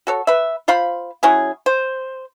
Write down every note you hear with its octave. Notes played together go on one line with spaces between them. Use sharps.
F#4 A4 C#5
B4 E5
F4 C5 F5 B5
F#3 C#4 E4 G#4
C5